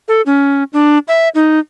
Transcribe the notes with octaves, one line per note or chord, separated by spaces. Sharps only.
A4
C#4
D4
E5
D#4